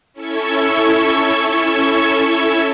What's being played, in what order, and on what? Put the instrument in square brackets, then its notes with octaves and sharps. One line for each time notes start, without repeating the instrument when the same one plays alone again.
[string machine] C#4 E4 A4 C#6 E6 G#6